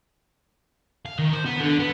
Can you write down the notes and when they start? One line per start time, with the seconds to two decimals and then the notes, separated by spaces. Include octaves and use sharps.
1.06 F5
1.19 D#3
1.33 C5
1.46 B3
1.60 D3
1.79 B3